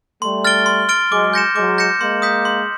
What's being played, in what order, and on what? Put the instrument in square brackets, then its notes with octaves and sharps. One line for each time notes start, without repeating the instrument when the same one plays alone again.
[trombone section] G3 A3 [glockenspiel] C6
[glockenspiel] F6 A6 D7 G7
C6
F6 A6 D7 G7
[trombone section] F#3 G#3 [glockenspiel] D6
[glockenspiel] G6 A#6 C#7 E7
[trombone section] F#3 G#3 [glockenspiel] D6
[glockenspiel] G6 A#6 C#7 E7
[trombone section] G#3 A#3 [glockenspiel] C6
[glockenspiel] D#6 G6 B6
C6